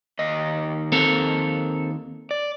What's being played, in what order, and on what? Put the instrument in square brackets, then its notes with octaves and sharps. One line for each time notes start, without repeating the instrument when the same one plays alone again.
[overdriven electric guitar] D#2 D#5
[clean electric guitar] C4 A4 A#4
[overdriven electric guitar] D5